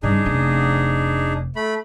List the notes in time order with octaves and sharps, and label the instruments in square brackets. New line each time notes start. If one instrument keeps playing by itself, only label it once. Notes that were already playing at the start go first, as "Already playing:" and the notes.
[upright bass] G2 C#3 [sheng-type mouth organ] D4 D#4 G#4
[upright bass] F1 C#4
[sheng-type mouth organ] A3 B5